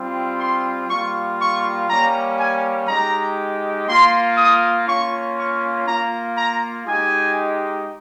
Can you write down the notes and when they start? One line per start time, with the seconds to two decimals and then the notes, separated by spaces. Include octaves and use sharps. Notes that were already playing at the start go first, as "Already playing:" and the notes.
Already playing: G3 C4 F4
0.39 C6
0.88 G3 A#3 F4 C#6
1.39 C#6
1.88 G3 A#3 C#4 A#5
2.39 G#5
2.88 G#3 D#4 G4 A#5
3.87 A#3 F4 C6
4.37 D#6
4.88 A#3 C#4 F4 C#6
5.37 C#6
5.87 A#3 F4 A#5
6.37 A#5
6.86 G#3 D#4 G4 G#5